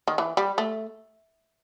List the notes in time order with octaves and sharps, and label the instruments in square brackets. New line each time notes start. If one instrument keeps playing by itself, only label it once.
[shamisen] D#3
E3
G3
A3